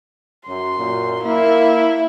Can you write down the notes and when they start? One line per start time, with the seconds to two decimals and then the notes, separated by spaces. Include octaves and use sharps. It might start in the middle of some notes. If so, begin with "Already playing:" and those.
0.47 F#2 C6
0.78 F#2 A#2
1.24 A#3 E4